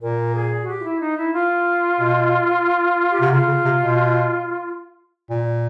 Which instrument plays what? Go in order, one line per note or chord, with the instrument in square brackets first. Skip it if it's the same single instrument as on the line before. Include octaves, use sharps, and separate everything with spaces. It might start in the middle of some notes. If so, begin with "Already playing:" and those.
[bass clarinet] A#2 [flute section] A#4
[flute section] G#4
F#4
G4
F4
E4
D#4
E4
F4
[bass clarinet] B2
[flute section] G4
[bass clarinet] C3 [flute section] F#4
[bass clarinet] C#3 [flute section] F4
[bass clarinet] C#3
C3
B2
A#2